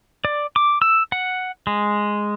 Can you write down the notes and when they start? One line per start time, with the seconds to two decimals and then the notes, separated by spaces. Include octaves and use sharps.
0.25 D5
0.56 D6
0.82 E6
1.12 F#5
1.67 G#3